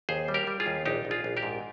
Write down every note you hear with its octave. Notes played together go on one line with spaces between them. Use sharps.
D#2 G#4 C5
G3
G4 A#4
G3
F4 G#4
D#2
A#1 D#4 G4
A#1
F4 G#4
A#1
G4 A#4
G#2